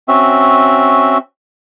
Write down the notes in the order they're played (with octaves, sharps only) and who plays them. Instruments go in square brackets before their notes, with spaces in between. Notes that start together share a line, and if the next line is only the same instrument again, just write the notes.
[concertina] C4 C#4 F#4 E5